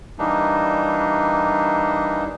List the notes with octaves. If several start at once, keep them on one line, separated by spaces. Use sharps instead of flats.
E3 G3 A#3 D4 D#4